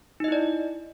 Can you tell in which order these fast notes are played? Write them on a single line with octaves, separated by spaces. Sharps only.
D#4 D#5 E4 D5